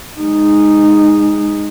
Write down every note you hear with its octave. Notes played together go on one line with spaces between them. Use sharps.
G#3 D#4